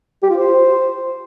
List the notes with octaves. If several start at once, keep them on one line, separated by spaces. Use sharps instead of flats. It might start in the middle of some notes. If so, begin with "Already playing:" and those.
G4
F4
C5